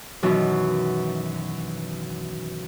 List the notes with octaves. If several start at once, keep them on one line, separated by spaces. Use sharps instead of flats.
F#2 B2 D#3 E3